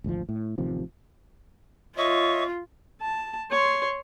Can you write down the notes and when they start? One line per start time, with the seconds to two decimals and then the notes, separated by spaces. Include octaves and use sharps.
0.04 G#1 D2 B2 F3
0.29 A2
0.58 A1 C3 D#3 F3
1.97 F4 C#5 D#5 E5 C#6
3.01 A5
3.51 C#5 C6